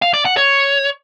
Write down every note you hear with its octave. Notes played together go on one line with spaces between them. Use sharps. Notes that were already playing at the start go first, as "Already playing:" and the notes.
F5
D5
F#5
C#5